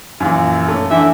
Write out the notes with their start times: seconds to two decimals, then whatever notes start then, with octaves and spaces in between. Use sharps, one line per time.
0.20 F#2 A#2 E3
0.68 A3 C#4
0.91 D3 E3 E5